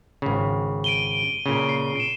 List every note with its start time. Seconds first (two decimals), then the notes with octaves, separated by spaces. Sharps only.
0.22 G#1 C#3
0.84 D7 D#7 G7
1.46 A#2 C#3
1.69 C7
1.96 D7 E7